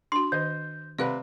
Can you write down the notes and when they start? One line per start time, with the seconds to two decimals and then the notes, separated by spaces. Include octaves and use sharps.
0.12 D4 F#4 C6
0.32 D#3 C5 D#5 G6
0.99 C3 B4 D5 F5 F#5